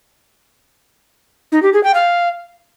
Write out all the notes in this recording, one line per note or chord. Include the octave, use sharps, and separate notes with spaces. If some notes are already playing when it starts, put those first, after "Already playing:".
D#4
G4
G#4
G5
F5